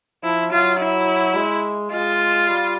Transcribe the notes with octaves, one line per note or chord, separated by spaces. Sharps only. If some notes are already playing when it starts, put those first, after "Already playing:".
F3 E4
F#3 F4
E4
G#3
G#3 F4
G3